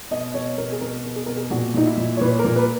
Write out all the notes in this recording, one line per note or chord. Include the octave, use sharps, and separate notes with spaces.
B2 D#5
B2 C#5
B2 A#4
G#4
B2 A#4
B2
G#4
B2 A#4
G#4
A#2 F#4
A#2 D#4
E4
A#2
C#5
A#2 B4
A#4
A#2
B4